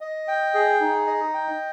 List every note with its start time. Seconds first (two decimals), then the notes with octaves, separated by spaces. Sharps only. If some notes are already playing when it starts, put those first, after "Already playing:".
0.01 D#5
0.28 G5
0.54 G#4
0.81 D#4
1.07 D#5
1.34 G5